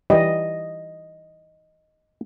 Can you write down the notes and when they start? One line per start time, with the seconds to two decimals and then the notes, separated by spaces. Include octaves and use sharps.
0.10 E3 G3 D#5